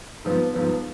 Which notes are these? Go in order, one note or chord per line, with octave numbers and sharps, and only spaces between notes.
G#2 F3 B3
G#2 F3 B3